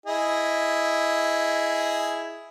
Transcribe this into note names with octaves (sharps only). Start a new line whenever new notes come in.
E4 G#4 D#5